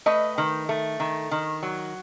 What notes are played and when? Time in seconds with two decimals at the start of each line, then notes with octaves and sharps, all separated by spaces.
0.06 A3 B4 D#5
0.38 D#3
0.69 A3
1.00 D#3
1.31 D#3
1.63 F#3